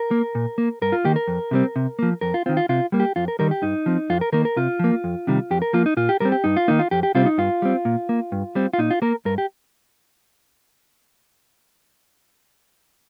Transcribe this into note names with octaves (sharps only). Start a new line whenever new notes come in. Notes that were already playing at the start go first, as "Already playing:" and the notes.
Already playing: A#4
A#3
A#2
A#3
G2 A#4
F4
D#3 A#3 G4
A#4
F2
C3 G3 C4
C3
F3 A#3
F2 A#4
F4
D#3 C4 F4
F4
C3 F4
G3 A#3
G4
F2 F4
A#4
D#3 G3 A#4
G4
G2 D#4
F3 C4
F2 F4
A#4
D#3 A#3 A#4
A#4
C3 F4
F3 A#3
F2
C3 D#3 G3
F2 G4
A#4
F3 A#3 F4
D#4
A#2 F4
G4
G3 C4 A#4
G4
G2 D#4
F4
D#3 A#3 D#4
F4
F2 G4
G4
C3 G3 C4 F4
D#4
G2 F4
G3 C4
A#2
A#3
G2
G3 C4
F4
A#2 D#4
F4
A#3 A#4
G2 A#4
G4